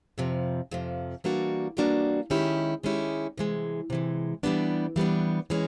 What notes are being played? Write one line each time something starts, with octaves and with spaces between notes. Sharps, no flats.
F2 C3 F3
F2 C3 F3
E3 G3 A#3 D4 F#4
E3 G3 A#3 D4 F#4
D#3 G#3 C#4 E4 G4
D#3 G#3 C#4 E4 G4
C3 E3 G#3
C3 E3 G#3
E3 G3 B3 D4
E3 G3 B3 D4
E3 G#3 C#4